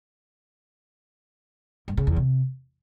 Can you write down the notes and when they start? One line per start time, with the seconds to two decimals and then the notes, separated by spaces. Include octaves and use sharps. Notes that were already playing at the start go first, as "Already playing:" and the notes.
1.88 G2
1.97 C#3
2.07 E2
2.16 C3